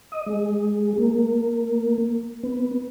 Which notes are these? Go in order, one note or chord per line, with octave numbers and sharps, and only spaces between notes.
D#5
G#3
A#3
B3